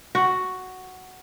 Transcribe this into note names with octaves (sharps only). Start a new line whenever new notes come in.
F#4